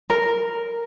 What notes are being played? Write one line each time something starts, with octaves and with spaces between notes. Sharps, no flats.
A#4